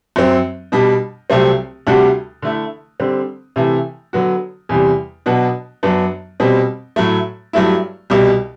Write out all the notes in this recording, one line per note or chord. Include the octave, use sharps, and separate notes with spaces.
F#2 F#3 C4
B2 G3 D4
C2 C3 F#3 A3 C4
D2 C3 G3 D4 F#4
D3 A3 E4
D3 G3 C4
C3 E3 A3 E4
D3 F#3 B3 F#4
E2 C3 G3
B2 F#3 B3 D4 F#4
F#2 F#3 B3 D4
B2 G3 C4
A2 F#3 A3
G2 F#3 A3 E4
C2 B2 G3